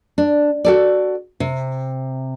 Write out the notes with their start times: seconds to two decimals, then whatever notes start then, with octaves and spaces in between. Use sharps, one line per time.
0.18 D4
0.65 F#4 A4 D5
1.40 C3